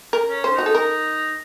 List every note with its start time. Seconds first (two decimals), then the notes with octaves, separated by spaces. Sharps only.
0.13 A#4
0.29 C#4
0.44 C5
0.52 D#4
0.58 F#4
0.66 A4
0.75 A#4